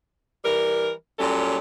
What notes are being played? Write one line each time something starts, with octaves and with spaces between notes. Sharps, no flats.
E3 G3 A#4
A#2 F#3 G3 C#4 A4